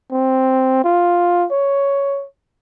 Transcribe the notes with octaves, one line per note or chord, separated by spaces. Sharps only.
C4
F4
C#5